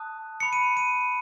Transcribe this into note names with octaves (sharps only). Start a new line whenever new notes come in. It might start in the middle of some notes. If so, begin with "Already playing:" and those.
Already playing: A5 D#6 F#6
B5 D#6 F#6 C#7
D#7
D#7